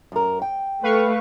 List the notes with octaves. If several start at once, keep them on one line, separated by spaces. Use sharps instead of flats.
F#2 A#4
G5
A3 B4 F5 C#6